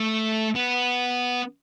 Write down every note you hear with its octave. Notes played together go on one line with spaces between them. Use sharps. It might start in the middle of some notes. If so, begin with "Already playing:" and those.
Already playing: A3
B3